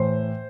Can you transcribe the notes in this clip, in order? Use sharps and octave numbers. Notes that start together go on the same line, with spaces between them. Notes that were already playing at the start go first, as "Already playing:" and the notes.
Already playing: A2 E3 C5